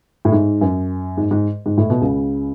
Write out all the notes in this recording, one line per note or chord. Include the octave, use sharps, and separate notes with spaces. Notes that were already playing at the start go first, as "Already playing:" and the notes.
A2
G#2
F#2
G#2
G#2
G#2
A2
B2
C#2 C#3